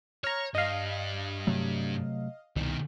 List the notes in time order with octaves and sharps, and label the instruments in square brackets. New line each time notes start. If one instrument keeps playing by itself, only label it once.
[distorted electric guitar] C#5 [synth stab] A#5 F6
[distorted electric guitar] G2 [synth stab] D#5 F5
[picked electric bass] C3 F#3 A3
[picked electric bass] C2 [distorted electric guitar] B2 D#3